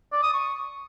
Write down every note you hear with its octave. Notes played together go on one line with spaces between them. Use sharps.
D5
D#6
C#6